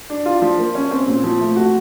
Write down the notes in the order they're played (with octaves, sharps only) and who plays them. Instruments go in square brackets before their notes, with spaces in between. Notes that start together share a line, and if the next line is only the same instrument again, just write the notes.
[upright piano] D4
F4
F3
A#3
C#4
C4
A#2
F3
A3
F#4